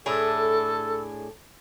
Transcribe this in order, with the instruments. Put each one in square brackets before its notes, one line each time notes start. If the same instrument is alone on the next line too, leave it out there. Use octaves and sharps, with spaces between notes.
[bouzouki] A2 D4 G#4 [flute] A4